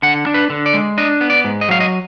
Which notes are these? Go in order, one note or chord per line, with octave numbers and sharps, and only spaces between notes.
D3 F#5
D4
B4
D3
D5
G#3
D4 D#5
B3
D5
G#2
D#5
F#3 F5
D#5